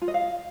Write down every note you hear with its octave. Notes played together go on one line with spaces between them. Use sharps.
F4
D#5
F5